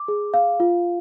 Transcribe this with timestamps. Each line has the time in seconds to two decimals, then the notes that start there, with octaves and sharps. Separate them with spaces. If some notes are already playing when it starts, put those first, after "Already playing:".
Already playing: D6
0.08 G#4
0.34 F5
0.60 F4